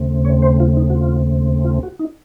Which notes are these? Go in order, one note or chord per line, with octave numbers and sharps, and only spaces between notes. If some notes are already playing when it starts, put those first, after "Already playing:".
Already playing: D#2 C#3 A3 C4
C#5
C5
F4
D#4
F#4
F4
F4
F#4
D#4